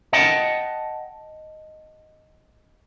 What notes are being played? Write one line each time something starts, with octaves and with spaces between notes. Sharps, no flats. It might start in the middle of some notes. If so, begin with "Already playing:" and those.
D#5 F#5 G5 A5